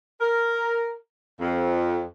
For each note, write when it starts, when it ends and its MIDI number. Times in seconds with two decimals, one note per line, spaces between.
0.21 0.94 70
1.40 2.02 41